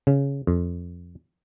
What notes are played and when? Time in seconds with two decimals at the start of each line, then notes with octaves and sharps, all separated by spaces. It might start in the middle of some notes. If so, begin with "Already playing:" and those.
0.07 C#3
0.47 F2